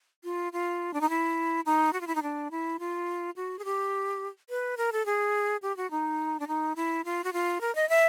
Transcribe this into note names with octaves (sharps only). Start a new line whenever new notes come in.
F4
F4
D4
D#4
E4
D#4
F#4
F4
E4
D#4
D4
E4
F4
F#4
G#4
G4
B4
A#4
A4
G#4
G4
F#4
D#4
D4
D#4
E4
F4
F#4
F4
A#4
D#5
E5